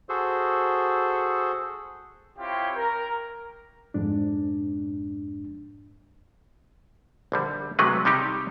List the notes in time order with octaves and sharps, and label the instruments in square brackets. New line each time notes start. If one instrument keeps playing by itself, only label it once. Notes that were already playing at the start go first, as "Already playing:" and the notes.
[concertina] F#4 G#4 A4 C5
[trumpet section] C4 E4 F4 G4 C#5 G5
A#4
[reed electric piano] F2 G#2 D4
[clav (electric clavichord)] A#1 D3 G3
C3 F#3 G#3 A3 B4
C3 G3 D#4 G4